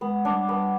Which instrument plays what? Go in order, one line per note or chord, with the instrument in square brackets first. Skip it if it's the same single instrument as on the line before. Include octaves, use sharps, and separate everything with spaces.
[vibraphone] G#3 [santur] B3
[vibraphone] G3 [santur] D4
[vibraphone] G3 [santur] B3